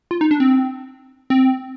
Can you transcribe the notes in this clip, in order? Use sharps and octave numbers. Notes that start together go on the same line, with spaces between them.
F4
D#4
D4
C4
C4